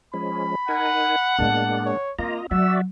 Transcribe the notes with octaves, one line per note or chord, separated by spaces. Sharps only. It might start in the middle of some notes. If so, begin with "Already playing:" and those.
F3 G#3 C#4 B5
D#4 A#4 F#5 G#5
A2 G#3 A#3 B3 D4 A5
C#5
A#3 C4 F4 D#5 A#5
F#3 F#4 D5 E5 F#5 E6